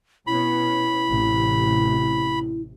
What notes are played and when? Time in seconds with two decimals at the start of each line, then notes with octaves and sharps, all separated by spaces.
0.27 B2 B3 C#4 E4 B5
1.08 A1 C3